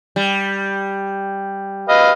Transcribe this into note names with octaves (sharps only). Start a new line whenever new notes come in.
G3
B4 D#5 F5